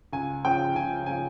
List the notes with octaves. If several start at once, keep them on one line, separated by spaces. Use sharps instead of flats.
C#2 G#5
C#3 F3 G5
C#2 G#5
C#3 F3 G#5